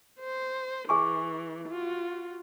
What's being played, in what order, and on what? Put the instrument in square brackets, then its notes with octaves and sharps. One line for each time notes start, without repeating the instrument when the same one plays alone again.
[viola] C5
[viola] E3 [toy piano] G#4 G#5 C#6
[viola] F4 F#4